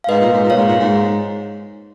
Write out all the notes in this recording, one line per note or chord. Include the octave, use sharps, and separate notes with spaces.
F5
G#2 B4 D#5
A#2
G#2
A#2
C#5 F5
G#2
A#2
G#2